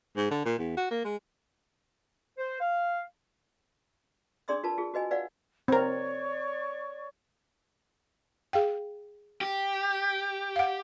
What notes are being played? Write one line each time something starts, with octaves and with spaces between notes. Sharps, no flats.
G#2
D3
A#2
E2
F#4
A#3
G#3
C5
F5
D4 G#4 D5 C6 D#6 E6
F4 A#4 B4 A5
F4 G#4
F#4 B4 D#5 G#5
B4 D5 F5 F#5
C4 A#4 C#5 D5 C#6
G#4 F5 G5
G4
F5 F#5